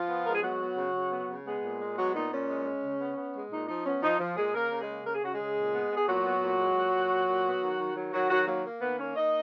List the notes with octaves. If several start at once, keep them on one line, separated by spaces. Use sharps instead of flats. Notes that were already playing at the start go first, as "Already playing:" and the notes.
Already playing: F3 F4
B3
G#3 A#4
G#4
F#3 B3 F#4
B3
C#3
C#3
B3
C#3
G#3 B3 G#4
A#2
G#3
F#3 B3 F#4
A#2 D#4
A#2 C#4
G#3
G#3
C#3
B3
B3
G#3
A#2 D#4
F3 D#4
B3 C#4
F3 D#4
F3
A#2 G#3 G#4
C#3 A#3 A#4
C#3
G#3 G#4
A#3
C#3 A#4
G#4
C#3 F#4
C#3 G#3 G#4
A#2
B3
B3
G#4
A#2 F#3 F#4
B3
A#2
G#3
A#2
A#2
A#2
A#2
B3
D#3
D#3
F#3
D#3 F#3 F#4
D#3 F#3 F#4
F#3 A#3 F#4
A#3
D#3 B3 B4
A#3 C#4 C#5
A#3 D#4 D#5